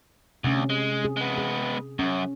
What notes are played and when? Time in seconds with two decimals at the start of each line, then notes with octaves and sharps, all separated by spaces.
0.44 D2 C3 C#4
0.70 G#3
1.05 G#4
1.17 G#3 B3
1.38 G#4
1.99 F#2 C#4